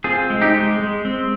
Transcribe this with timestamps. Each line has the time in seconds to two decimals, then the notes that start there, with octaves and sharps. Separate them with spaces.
0.04 C4 F4 G#4
0.30 G#3
0.41 D#4 G4
0.54 G#3
0.80 G#3
1.05 C4